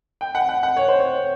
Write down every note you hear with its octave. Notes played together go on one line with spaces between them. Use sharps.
G5
F#5
F#5
F#5
C#5
C5
C#5